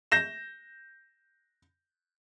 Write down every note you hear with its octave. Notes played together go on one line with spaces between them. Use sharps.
G6 A#6 E7